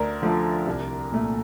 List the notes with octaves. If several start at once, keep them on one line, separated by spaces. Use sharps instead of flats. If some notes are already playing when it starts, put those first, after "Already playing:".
Already playing: D2 A#4 D5
D3 F3 A3
C2
A#2 A3